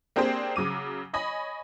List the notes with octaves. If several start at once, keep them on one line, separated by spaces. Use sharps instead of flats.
A#3 C4 D4 G4 G#4 C5
C#3 F#3 D6 D#7
C#5 D#5 G#5 B5